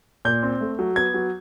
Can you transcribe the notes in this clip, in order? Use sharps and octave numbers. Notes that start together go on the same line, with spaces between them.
A#2 G6
C4
A3
F#3
B3 G#6
F#3